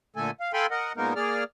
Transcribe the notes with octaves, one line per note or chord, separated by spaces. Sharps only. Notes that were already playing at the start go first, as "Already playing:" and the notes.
A#2 D3 A3 A4 G#5
F5
A4 F5 G5 G#5 B5 C6
A#4 D#5 F#5
A#2 G#3 A#3 B3 D#4 A#4
A#3 G#4 D5 F6